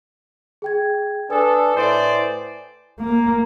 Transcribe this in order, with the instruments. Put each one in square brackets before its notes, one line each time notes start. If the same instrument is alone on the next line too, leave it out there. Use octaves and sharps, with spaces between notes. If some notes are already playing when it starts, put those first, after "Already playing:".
[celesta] G#4 G5 G#6
[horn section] D4 A4 [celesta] B4 G#5 D#6
[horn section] A2 C5 D5
[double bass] A#3